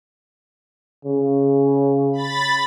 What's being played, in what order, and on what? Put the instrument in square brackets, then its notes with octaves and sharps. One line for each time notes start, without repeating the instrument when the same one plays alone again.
[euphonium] C#3
[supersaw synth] B5 A6